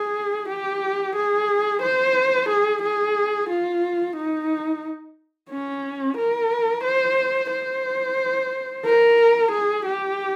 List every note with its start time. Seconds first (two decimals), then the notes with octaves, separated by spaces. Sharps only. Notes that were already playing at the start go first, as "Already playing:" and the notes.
Already playing: G#4
0.49 G4
1.16 G#4
1.83 C5
2.49 G#4
2.83 G#4
3.49 F4
4.16 D#4
5.50 C#4
6.17 A#4
6.84 C5
7.51 C5
8.85 A#4
9.52 G#4
9.86 G4